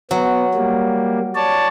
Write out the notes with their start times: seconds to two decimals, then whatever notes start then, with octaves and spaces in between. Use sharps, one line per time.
0.11 F#3 B3
0.54 G3 A#3
1.35 C#5 D5 A5